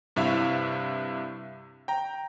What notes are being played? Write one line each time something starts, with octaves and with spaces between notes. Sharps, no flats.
G2 C3 E4 E5 F5
G5 A#5